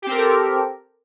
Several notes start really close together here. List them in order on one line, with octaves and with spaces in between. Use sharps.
G4 C4 A#4 A4